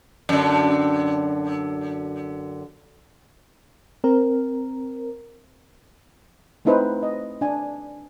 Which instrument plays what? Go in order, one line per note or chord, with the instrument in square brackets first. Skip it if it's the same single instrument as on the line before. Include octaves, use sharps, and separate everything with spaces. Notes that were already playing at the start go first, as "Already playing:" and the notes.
[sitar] F#2 D3
[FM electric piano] C4 A#4
[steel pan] A3 C4 D#4 E4 B4 C5
D#5
D4 G#5